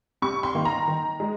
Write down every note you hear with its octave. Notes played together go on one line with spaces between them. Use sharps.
C3 C#6
C6
D#3 A#3
A#5
D#3
G#3